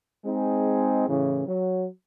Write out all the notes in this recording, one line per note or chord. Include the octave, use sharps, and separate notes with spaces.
G#3 C4 D#4 G#4
A2 C#3 E3
F#3